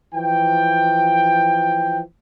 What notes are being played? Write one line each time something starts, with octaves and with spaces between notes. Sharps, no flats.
E3 F3 G5